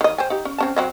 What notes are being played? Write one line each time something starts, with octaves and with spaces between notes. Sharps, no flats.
D#3 D#5
C5 G5 G#5
D#4 G4
C#4
C4 C#4 A5
F#3 C4 D#5